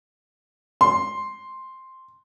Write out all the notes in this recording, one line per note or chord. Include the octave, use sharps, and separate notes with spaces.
C6